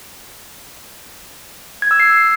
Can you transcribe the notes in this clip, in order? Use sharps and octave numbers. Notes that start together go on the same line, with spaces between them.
G#6
E6
C7